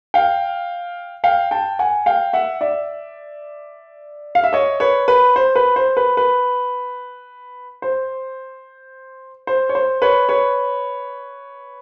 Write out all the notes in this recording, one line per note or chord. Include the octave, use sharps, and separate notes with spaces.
F5 G5
F5 G5
G5 A5
F#5 G#5
F5 G5
E5 F#5
D5 E5
F5
E5
C#5 D#5
B4 C#5
B4
C5
B4
C5
B4
B4
C5
C5
C#5
C5
B4 C#5
B4 C#5